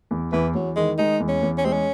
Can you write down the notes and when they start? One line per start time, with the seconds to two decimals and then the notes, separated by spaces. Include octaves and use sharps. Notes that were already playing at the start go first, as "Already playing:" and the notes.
0.11 E2
0.32 E2 E3
0.55 E2 F#3
0.76 D#3 G#3
0.98 G#3 D#4
1.20 E2
1.28 C#4
1.42 E2
1.58 C#4
1.64 G#3 C4
1.73 C#4